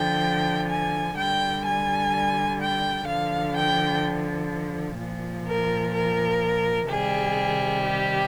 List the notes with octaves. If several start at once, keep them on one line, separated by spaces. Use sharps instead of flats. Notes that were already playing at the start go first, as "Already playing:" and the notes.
Already playing: D3 F3 G5
G#5
D3 G3 G5
G#5
G5
D3 F3 F5
G5
A#2 F3
A#4
A#4
C3 D#3 G3 G#4
G4